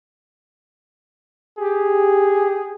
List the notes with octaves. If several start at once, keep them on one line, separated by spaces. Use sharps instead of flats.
G4 G#4